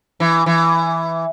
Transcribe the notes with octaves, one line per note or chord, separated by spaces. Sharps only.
E3
E3